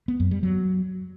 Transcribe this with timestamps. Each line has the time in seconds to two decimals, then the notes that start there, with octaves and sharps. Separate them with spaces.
0.08 B3
0.20 F#2
0.31 G3
0.43 F#3